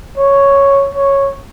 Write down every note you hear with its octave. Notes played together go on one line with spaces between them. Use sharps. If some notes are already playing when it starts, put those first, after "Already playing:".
C#5
C#5